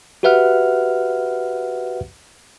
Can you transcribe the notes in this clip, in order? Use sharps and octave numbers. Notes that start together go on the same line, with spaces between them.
F#4 G4 B4 E5 F#5 F6